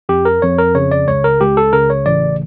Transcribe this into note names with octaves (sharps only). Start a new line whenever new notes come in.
F2 G4
A#4
F2 C#5
A#4
C#3 C#5
D5
C#2 C#5
A#4
C#2 G4
A4
C#3 A#4
C#5
A1 D5